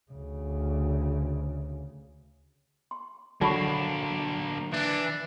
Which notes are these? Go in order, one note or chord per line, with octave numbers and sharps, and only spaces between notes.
D2 C#3
C6
D3 F#3 A#3 D4 A5 B5 C#6
E3 D4